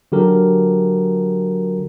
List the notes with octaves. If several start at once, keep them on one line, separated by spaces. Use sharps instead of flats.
D3 F#3 F#4 G4 A4 A#4